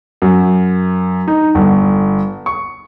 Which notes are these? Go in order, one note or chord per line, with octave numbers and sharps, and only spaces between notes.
F#2
D#4
G1
C#6